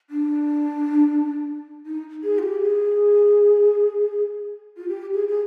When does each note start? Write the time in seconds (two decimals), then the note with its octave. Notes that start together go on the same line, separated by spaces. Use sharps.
0.10 D4
1.86 D#4
2.23 G#4
2.39 F4
2.43 G4
2.62 G#4
4.77 F4
4.88 G4
5.13 G#4
5.28 G#4